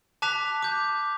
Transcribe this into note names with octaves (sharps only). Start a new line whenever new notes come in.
A5 D6 F#6 B6 F7
D6 G6